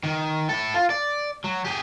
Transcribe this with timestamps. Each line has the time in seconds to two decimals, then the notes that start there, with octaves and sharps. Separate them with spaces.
0.04 D#3
0.49 E4 A4
0.74 F4
0.90 D5
1.44 F#3
1.64 G4 G#4